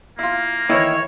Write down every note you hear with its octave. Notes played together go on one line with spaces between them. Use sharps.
A#3 E4 F4
D#3 E3 E4 C#5